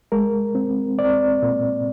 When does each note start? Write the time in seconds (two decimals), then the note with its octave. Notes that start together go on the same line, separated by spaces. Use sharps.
0.12 G#3 A#4
0.55 C4
0.99 C4 D5
1.42 A#2